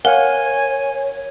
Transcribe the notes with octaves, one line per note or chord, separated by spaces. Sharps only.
A#4 C#5 F5 F#5 G#5